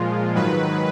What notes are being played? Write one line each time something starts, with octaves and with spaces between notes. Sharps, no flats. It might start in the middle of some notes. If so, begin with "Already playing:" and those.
Already playing: A#2 F3 G#3 F4
G#2 D#3 F#3 B4